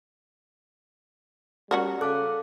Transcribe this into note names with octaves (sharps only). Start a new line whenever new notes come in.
G3 C#4 F#4 A#4
C#3 A4 F5 A5 D6 F#6